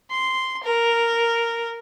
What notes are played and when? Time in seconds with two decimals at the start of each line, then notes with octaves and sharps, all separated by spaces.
0.11 C6
0.64 A#4